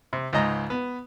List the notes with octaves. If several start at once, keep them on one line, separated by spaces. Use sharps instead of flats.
C3
C#2 G#2 D#5 A#5
B3